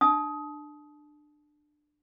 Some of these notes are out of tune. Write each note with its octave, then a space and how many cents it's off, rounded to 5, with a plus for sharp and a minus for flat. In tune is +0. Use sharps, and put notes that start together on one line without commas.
D4 +20 A5 -30 D#6 +20